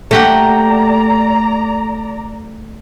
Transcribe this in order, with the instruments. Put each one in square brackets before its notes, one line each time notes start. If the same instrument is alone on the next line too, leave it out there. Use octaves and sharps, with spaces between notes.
[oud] A3 [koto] A#3 G4 F#5 [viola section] D5 A#5